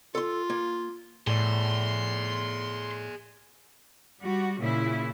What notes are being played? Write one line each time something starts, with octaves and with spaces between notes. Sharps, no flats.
F4 A4 C6
A#3
A2 G#4 D5 C6
G3 F#4
A#2 C#3 E4